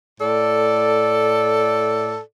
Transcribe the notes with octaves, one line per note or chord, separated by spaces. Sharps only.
A2 A4 D5